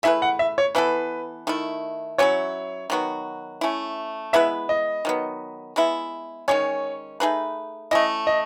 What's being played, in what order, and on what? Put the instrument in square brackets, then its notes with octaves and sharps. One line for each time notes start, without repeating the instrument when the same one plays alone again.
[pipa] A3 E4 G#4 B4 [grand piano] E5
[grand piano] F#5
E5
C#5
[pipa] E3 B3 E4 A4 [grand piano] B4
[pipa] D#3 A3 E4
[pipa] F#3 C#4 E4 [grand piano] C#5
[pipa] D#3 F#3 B3 F#4
A3 C#4 E4
[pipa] G#3 B3 E4 B4 [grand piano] E5
[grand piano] D#5
[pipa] D#3 F#3 B3
G#3 B3 E4
[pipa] D#3 G#3 C#4 [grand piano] C#5
[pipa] A3 D#4 G#4 B4
[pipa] A3 C#4 E4 [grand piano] D#5
[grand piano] D#5